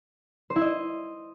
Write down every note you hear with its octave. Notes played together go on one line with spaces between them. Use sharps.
C5
E4
D#5